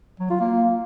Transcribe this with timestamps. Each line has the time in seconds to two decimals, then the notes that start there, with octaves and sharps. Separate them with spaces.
0.20 F#3
0.30 F4
0.40 A#3